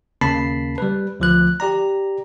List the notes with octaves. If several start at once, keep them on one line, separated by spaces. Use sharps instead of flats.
D#2 C#3 A#3 A5 B5 C7
G3 B4
D2 F3 F#6
G4 D5 A#5